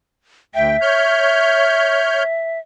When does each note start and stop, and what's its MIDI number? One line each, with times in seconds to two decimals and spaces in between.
0.55 0.77 38
0.55 2.59 76
0.55 0.77 79
0.81 2.23 73
0.81 2.23 89
0.81 2.23 91